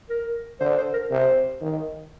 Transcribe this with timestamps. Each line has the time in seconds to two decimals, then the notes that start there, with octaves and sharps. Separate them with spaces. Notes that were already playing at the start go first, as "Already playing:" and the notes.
0.10 A#4
0.60 D3 C5
0.78 C5
0.93 A#4
1.10 C3 C5
1.62 D#3